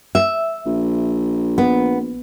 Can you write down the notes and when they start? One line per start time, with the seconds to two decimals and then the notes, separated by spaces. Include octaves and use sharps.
0.15 E5
0.66 A#1
1.58 B3